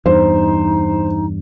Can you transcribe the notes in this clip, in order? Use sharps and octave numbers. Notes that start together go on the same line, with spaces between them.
E2 G2 D#4 C5